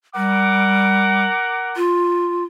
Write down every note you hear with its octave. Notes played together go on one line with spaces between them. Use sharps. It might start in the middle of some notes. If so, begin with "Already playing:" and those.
G3 A#4 F#5 D6
F4